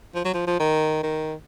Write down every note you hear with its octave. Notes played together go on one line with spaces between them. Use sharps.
F3
F#3
F3
F3
D#3
D#3